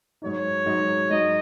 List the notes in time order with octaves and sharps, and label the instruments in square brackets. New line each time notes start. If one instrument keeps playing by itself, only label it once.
[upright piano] G#2 F#3 D#4 [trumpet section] C#5
[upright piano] G#2 F#3 D#4
[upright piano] G#2 F#3 D#4 [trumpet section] D#5